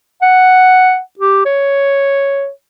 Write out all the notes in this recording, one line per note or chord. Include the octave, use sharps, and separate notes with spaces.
F#5
G4
C#5